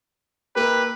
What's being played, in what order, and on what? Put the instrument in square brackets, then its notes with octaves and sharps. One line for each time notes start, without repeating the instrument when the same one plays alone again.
[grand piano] A#3 A#4 [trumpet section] E4 G4 B4